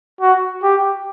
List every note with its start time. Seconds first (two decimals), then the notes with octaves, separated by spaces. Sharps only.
0.21 F#4
0.63 G4